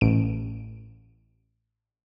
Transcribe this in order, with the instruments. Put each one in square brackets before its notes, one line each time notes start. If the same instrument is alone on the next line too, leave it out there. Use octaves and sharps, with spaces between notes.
[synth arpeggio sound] A1 D7